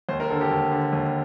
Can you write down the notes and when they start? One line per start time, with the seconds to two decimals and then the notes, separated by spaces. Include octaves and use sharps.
0.09 D#2 C5
0.20 A#4
0.30 D3 A4
0.41 G4
0.50 D#2
0.72 D3
0.93 D#2